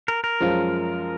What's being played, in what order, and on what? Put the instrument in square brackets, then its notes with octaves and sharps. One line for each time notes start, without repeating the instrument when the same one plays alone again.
[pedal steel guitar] A#4
A#4
[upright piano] F#2 F3 G#3 C#4 F4